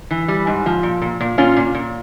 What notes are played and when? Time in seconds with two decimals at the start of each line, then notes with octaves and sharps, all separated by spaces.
0.11 E3
0.28 G3
0.47 G#2
0.66 F3
0.83 A#2
1.02 A#2
1.21 A#2
1.38 A#2 C#4 F4
1.57 A#2
1.75 A#2